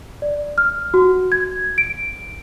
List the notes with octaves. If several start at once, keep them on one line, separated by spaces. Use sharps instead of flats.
D5
F6
F#4
G#6
D7